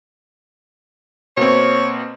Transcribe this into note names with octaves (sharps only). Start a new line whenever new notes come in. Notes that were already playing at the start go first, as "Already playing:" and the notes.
B2 A#3 C4 C#5